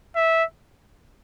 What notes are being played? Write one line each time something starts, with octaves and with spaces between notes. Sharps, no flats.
E5